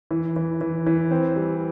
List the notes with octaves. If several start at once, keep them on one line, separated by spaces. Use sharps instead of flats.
E3
E3
E3
E3
C4
G3